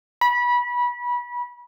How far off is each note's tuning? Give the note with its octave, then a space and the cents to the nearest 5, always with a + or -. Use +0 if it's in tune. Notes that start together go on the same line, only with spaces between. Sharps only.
B5 -25